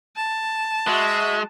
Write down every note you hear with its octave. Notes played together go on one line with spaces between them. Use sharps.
A5
G#3 F#4 E5